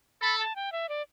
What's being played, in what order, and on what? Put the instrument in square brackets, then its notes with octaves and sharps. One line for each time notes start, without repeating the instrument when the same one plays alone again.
[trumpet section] A4 [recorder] B5
[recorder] A5
G5
E5
D5